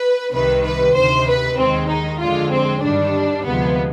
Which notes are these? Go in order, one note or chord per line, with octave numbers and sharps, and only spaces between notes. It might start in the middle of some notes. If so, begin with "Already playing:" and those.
Already playing: B4
C2 C3 D#3 B4
B4
D2 C3 D#3 C5
B4
D#2 D#3 G#3 C4
D#4
F2 D3 G#3 F4
C4
G2 D#3 G3 D4
D2 C3 F3 G#3 B3